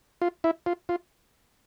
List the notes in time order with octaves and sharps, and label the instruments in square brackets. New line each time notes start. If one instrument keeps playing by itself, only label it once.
[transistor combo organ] F4
E4
F4
F4